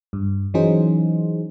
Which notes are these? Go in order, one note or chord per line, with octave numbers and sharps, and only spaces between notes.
G2
E3 F#3 C#4 D#4 G#4 C5